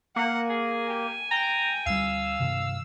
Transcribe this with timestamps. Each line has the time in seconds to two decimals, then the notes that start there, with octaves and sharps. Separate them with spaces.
0.16 A#3 F#5
0.50 G#4 G#5
0.89 G4
1.31 G5 A#5
1.86 D2 G3 F5 E6
2.40 G2 C3 D#3